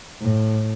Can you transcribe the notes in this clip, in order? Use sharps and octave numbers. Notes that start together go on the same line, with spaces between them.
A2